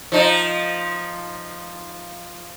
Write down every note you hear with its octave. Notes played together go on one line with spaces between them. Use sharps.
F3 D#4